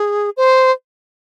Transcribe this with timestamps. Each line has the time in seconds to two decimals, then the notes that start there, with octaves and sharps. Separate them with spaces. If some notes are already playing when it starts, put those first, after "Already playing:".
Already playing: G#4
0.37 C5